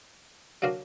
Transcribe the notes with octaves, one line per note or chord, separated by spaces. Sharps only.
F#3 A#3 D4 F#4 A#4